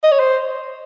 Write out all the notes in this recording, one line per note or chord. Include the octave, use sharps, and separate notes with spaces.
D#5
C#5
C5